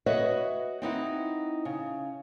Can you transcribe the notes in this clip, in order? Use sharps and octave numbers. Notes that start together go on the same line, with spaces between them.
F#4 B4 C#5 D#5 E5 F#5
C4 D#4 E4 F#5
C#3